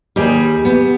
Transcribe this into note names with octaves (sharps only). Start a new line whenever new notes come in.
D#2 G3 A#3 G4 G#4 G#5
B3